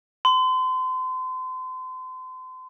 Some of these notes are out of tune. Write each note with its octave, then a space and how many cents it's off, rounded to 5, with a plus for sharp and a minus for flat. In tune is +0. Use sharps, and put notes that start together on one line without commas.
C6 -35